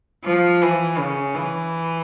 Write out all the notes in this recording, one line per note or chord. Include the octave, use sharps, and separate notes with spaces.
F3
E3
C#3
E3